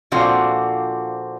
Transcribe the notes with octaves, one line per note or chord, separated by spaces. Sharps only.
A#2 D3 F3 C4 F#4